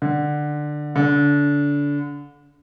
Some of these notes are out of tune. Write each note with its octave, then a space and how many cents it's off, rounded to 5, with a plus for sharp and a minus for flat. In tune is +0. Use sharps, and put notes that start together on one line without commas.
D3 +15
D3 -25